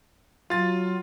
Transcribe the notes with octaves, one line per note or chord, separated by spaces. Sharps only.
F#3 F4 A6